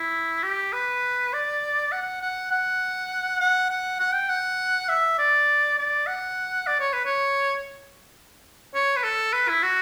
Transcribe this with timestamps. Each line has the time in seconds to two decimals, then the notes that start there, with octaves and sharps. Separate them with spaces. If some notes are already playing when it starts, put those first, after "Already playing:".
Already playing: E4
0.43 G4
0.73 B4
1.33 D5
1.92 F#5
2.22 F#5
2.51 F#5
3.40 F#5
3.70 F#5
4.00 F#5
4.14 G5
4.30 F#5
4.89 E5
5.19 D5
5.78 D5
6.07 F#5
6.67 D5
6.80 C#5
6.93 B4
7.05 C#5
8.74 C#5
8.97 B4
9.04 A4
9.33 B4
9.48 E4
9.63 F#4